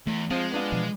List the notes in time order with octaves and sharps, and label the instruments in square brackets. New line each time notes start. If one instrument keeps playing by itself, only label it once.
[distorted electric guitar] E2 [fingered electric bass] A3
[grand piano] F3 [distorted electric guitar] G#3 G#4 [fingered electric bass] C4
[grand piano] B3 D4 F4
[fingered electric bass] B2 E3 F3